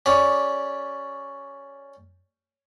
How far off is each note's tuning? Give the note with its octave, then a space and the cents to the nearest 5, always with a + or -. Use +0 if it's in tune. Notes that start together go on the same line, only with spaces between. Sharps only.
C#4 +5 G4 +0 D5 +0